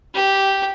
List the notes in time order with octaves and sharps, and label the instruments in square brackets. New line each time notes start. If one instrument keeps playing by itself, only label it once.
[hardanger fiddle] G4